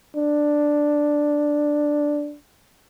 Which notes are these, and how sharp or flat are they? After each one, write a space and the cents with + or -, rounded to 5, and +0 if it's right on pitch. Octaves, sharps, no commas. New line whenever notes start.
D4 +5